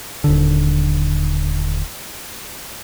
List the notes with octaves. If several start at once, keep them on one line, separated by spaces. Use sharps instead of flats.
D#1 D3